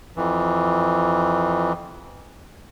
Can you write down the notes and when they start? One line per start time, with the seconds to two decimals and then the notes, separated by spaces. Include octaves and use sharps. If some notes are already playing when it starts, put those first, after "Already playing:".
0.16 F2 E3